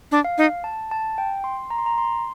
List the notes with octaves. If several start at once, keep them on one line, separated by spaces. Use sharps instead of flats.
D4
F5
D#4
A5
A5
G5
C6
A#5
C6
A#5
C6